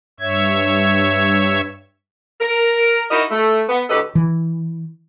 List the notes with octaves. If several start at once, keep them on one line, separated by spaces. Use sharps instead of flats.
G2 C#5 E5 G#6
A#4
D#4 E4 F#4 A#4 D#5
A3
B3
D2 A2 G4 A4 B4 D#5
E3